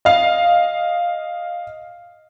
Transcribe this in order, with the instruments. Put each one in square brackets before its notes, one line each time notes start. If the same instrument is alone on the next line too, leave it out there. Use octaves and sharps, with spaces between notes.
[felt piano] D#5 F5